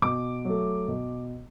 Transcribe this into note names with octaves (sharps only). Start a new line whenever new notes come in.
B2 D6
F#3 A3
B2